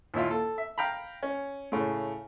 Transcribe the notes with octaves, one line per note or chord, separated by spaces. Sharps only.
D#2 A#2 E4 F4
A4
E5
F5 G5 A#5 B5
C#4
A2 C#3 A3